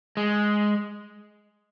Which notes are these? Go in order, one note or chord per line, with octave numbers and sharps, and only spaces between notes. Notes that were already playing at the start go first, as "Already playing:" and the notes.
G#3